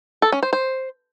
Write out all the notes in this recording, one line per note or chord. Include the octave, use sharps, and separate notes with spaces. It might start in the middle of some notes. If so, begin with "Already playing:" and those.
A4
C#4
C5
C5